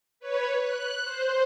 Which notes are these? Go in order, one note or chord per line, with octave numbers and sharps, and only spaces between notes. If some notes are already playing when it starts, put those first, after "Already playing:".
B4 C#5
F#6
C5